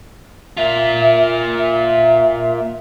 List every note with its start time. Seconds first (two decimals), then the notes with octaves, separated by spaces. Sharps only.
0.57 A#3 F4 E5
1.57 E5